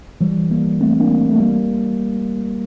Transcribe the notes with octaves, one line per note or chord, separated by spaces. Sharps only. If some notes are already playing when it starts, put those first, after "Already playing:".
E3 G3
G3 A#3
A3 C4
A#3 D4
A3
G3 A#3